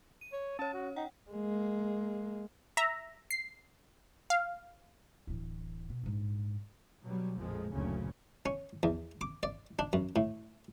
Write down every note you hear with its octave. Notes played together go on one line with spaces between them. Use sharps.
D#7
C#5
C#4 C#5 A5
F#4
D#4 F#5 G5
G#3 A#3
E5 A#5
C7
F5
D1 E3
B2
A#1 G#2
B2 F#3 G3
A1 F2 A#2 F3 G#3
F#1 D2 A#2 C#3 C#4
C#4
E2
D6
D5
D4
F#2
A2